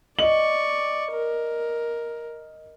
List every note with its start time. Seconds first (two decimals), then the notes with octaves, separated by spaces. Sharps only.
0.19 D5 D#5 C#6 F#7
1.12 A#4